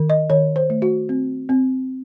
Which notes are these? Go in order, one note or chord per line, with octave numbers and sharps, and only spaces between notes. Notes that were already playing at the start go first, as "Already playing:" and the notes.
Already playing: D#3
D#5
D#3 C#5
C5
A3
F#4
C4
C4